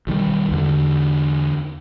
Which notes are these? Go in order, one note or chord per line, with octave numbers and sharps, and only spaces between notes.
B1 D#3 F3 G3
E2 D3